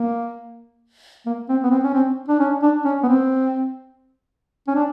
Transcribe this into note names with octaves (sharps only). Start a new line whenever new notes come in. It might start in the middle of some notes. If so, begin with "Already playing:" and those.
Already playing: A#3
A#3
C4
B3
C4
C#4
C4
D4
C#4
D4
C#4
B3
C4
C#4
D4